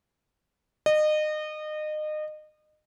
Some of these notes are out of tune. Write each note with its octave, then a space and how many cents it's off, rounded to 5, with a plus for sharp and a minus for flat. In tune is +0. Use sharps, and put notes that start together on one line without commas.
D#5 -30